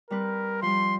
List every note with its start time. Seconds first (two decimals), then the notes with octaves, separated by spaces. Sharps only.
0.11 G3 C4 A#4 B4
0.62 F3 G3 C6